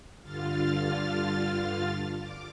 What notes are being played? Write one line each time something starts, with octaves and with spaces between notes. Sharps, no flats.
G2 D3 F4 F6 A6
D6